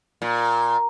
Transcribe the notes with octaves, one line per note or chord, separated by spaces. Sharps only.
A#2